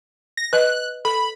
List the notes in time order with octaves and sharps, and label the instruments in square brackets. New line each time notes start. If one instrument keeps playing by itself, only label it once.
[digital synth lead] A#6
[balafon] B4 D#5 [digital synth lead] F#6
[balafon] A4 [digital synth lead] B5